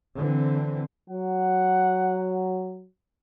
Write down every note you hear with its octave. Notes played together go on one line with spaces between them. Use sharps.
D3 E3 C4
F#3 F#5